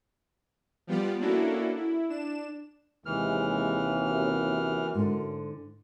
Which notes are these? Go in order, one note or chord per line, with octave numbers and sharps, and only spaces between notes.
F3 G3 B3 F4 G4 D5
A#3 C#4 D4 E4 F#4 A4
E4
D4 E7
D#2 C3 E3 G#3 F6
F#2
G#2 D3